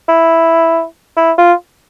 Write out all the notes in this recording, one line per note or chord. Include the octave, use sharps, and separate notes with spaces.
E4
E4
F4